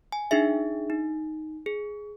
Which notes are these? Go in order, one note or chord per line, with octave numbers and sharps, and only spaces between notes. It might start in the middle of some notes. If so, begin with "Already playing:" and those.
G#5
D4 D#4 G#4 E5
D#4
G#4